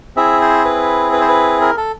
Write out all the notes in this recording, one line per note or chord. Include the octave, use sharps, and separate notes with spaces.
C4 E4 G#4 E5
C5
B4
B4
C5
B4
A#4
A4